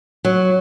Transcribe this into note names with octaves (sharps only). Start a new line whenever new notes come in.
F#3